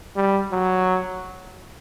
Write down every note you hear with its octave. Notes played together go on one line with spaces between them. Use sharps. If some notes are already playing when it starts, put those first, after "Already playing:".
G3
F#3